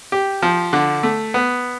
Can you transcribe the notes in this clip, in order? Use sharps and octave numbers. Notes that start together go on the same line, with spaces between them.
G4
F3
D3
A3
B3